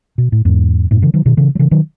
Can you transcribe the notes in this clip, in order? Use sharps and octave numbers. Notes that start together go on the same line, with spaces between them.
B2
A2
E2 G#2
F#2 A2
C#3 E3
D#3 F#3
B2 D#3
C#3 E3
F#3
C#3 E3
D#3 F#3